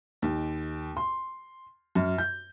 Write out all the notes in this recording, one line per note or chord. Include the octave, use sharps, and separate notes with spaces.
D#2
C6
F#2
G6